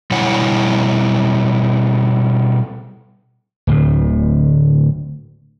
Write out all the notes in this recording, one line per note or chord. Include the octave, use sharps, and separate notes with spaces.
B2 G3 E4 C#5 F#5 G#5
D1 D2 A2